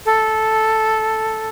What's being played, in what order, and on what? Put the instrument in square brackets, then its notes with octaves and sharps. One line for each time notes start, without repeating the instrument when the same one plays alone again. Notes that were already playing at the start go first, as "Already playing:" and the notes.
[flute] A4